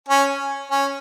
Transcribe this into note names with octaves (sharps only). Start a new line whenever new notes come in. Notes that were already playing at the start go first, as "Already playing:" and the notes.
C#4
C#4